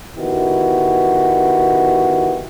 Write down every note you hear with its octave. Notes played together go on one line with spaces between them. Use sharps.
D#3 B3 E4 F#4 G4